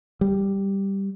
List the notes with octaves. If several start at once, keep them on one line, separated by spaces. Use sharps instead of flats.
G3